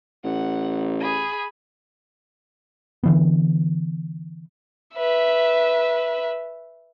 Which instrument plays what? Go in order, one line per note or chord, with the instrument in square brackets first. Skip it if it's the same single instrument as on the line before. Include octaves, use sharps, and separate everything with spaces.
[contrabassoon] A1 [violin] F#5
[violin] G#4 B5
[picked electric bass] D3 E3 B3
[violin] B4 E5